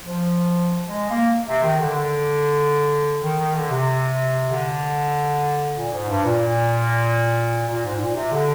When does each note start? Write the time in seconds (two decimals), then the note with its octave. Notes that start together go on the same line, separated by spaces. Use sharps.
0.04 F3
0.88 G#3
1.10 A#3
1.46 C3
1.62 D#3
1.78 D3
1.94 D3
3.21 D#3
3.37 D#3
3.54 D3
3.70 C3
4.49 D3
5.76 A#2
5.92 G#2
6.09 G2
6.24 A#2
7.68 A#2
7.84 G#2
7.99 A#2
8.15 C3
8.32 D3